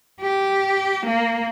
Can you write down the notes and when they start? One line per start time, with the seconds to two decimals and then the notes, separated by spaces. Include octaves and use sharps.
0.21 G4
1.06 A#3